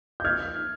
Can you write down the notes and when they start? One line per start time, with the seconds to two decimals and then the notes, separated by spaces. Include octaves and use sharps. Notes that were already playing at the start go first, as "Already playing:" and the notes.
0.20 G6
0.25 F6 G#6